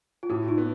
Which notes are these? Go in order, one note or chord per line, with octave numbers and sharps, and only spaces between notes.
F4
A2 E4 F#4
D#4 F4
B3